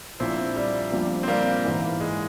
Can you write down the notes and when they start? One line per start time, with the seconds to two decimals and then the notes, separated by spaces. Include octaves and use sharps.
0.20 A#1 A#2 F3 C4 E4
0.56 G3
0.92 A#1 A#2 G3 C4 F4
1.23 C4
1.28 G3 A#3
1.64 G#2 E3 A#3 E4
2.01 G#3